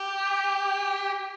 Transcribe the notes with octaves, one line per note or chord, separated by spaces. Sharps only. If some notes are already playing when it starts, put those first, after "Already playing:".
Already playing: G4